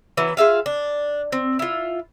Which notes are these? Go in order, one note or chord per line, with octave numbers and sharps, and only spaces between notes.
E3 F#3 B3
F4 G#4 E5 F5
D4
C4
E4 F4